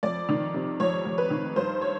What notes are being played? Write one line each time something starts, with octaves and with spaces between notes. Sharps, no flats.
F2 D5
D#3
C3
F2 C#5
F2
B4
D#3
G2 C5
C#5